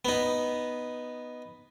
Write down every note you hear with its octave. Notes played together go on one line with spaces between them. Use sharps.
B3 D#4